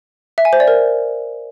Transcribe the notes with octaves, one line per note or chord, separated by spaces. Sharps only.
E5
G#5
C5
D5
A#4